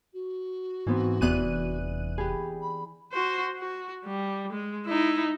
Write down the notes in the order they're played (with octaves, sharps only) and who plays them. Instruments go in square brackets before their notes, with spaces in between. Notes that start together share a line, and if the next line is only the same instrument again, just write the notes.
[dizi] F#4
[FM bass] G#2 [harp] E3 B3 C4
[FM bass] F1 [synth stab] E2 F#6 D#7 [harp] E3 B3 D4
[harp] G4 G#4 [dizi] B5
[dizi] B5
[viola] F#4 C5
F#4
G3
G#3
D#4 E4